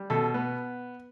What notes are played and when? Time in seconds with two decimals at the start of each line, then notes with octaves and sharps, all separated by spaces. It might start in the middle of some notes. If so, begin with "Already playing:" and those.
Already playing: G3
0.10 B2 A4
0.34 B3